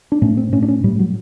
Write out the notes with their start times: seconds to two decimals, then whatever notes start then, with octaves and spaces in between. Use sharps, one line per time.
0.12 D4
0.22 A2 C#4
0.37 C4
0.52 A2 C#4
0.62 D4
0.68 C#4
0.84 A2 G3
0.99 F#3